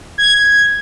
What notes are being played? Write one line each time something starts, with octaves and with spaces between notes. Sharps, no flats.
G#6